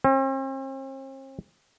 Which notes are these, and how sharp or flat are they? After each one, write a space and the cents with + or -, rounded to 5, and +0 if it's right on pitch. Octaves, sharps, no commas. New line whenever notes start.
C4 +45